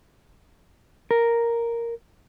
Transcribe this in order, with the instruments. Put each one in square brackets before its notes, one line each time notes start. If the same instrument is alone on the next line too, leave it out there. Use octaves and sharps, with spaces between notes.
[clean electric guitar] A#4